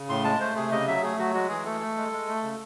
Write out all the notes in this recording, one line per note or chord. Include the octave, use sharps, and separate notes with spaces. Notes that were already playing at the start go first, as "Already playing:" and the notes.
Already playing: C#3
A2 C6
G#3 A5
A3 C5
C3 G#4
C#3 D#5
F#3 E5
A3 G#4
F#3 F#4
G#3 F#4
E3 G#4
A3 A4
A3
G#3
G#3
A3
C#3